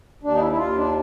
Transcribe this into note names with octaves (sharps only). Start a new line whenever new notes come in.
D#2 D4
D#4
E4
E4
D#2 F4
D4